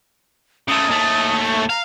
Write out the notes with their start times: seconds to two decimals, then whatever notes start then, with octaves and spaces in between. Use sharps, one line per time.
0.68 C#3 A3 D#6
0.88 D#2 A3
1.44 C#6
1.70 F5 A#5